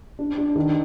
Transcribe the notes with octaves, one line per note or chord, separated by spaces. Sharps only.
D4
D4
D#3